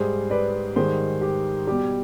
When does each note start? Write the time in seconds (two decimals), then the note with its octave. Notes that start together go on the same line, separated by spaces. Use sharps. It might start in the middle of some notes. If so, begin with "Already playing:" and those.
Already playing: G#2 G3 G#4 C5
0.30 B4 D5
0.76 G#2 D#3 G3 G#4 C5
1.21 G4
1.67 B2 G3 G4